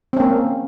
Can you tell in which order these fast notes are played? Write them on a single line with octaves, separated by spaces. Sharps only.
C4 C#4 A#3